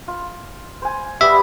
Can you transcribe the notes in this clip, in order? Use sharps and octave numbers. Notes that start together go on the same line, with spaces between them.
F4
C5 G#5
G3 B3 D5 E5